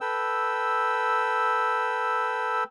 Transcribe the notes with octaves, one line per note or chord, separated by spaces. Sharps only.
A4 B4 G5 E6